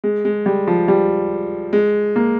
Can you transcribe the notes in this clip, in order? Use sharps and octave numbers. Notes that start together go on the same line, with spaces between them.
G#3
G#3
G3
F3
G3
G#3
A#3